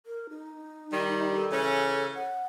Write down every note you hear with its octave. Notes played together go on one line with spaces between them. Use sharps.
A#4
D#4
D#3 G3
A4
C#3 E3 C#4
F#5